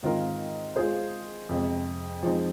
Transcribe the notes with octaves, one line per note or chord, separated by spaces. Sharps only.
G#2 D#3 C4 F4 A#4
G#3 F4 G#4 C5
F2 C3 G#3 C4
F3 G#3 C4 D#4